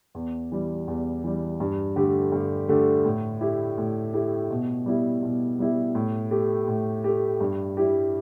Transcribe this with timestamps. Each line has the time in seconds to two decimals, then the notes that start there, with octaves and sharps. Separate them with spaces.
0.15 E2
0.52 E3 G3
0.88 E2
1.24 E3 G3
1.60 G2
1.96 D3 A3 G4
2.32 G2
2.69 D3 A3 G4
3.05 A2
3.41 A3 E4 G4
3.78 A2
4.14 A3 E4 G4
4.50 B2
4.86 G3 B3 E4 G4
5.23 B2
5.59 G3 B3 E4 G4
5.95 A2
6.31 A3 G4
6.68 A2
7.04 A3 G4
7.41 G2
7.77 G3 E4 G4